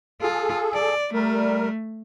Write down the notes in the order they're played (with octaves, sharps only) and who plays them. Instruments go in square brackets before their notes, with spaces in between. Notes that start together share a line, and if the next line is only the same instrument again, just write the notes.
[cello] F4 [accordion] G#4 A4
[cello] D5
[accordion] G3 A#4 [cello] A3